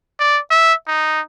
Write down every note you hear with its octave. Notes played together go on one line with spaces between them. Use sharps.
D5
E5
D#4